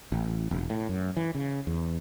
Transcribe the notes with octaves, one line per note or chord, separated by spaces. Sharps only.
A1
E1
A2
F#2
E3
C#3
E2